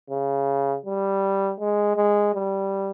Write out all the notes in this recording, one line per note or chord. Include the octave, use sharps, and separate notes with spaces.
C#3
G3
G#3
G#3
G3